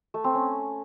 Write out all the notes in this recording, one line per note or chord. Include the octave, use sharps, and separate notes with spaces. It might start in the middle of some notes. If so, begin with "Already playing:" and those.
A3
C4
C#4